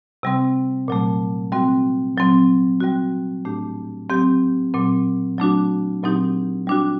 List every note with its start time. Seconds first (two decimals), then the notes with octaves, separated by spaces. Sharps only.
0.23 C3 G3 C4
0.88 A#2 F#3 A3
1.52 G3 C4 F#4
2.16 A#2 F#3 C4
2.80 G3 C4 F#4
3.45 A2 A3 D4 G4
4.10 F#3 C4 G4
4.74 A#2 F#3 C4
5.38 F#3 A3 D4 F#4
6.03 A#2 F#3 C4 D#4 G4
6.67 G3 D4 F#4